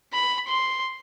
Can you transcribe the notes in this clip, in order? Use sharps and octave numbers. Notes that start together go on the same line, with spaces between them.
B5
C6